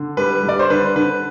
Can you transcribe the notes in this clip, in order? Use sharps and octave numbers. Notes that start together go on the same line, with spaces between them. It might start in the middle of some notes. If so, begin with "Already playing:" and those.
Already playing: D3
G3 B4
G3
D5
C5
D3 B4
D3 B4